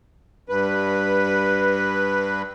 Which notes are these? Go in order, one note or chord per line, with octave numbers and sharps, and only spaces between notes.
G2 B4